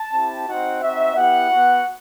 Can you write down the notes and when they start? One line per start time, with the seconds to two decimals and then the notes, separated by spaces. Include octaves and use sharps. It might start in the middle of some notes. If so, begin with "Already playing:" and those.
Already playing: A5
0.13 C4 E4 G4
0.46 C4 D#4 F#4 F#5
0.82 C4 D#4 F#4 E5
1.15 B3 E4 G4 F#5
1.50 B3 F#4